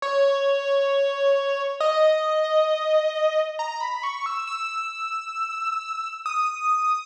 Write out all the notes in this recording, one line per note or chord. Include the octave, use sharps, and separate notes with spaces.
C#5
D#5
A#5
B5
C#6
E6
E6
D#6